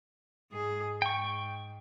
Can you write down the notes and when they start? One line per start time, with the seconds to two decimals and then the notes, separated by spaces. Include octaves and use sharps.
0.52 G#2 G#4
1.02 G#2 G5 C#6